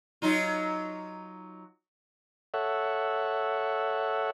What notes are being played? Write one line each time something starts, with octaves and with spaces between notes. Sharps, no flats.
F#3 D#4 F4
A4 C#5 E5 F#5